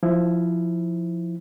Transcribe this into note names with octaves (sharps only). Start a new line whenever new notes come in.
F3 E4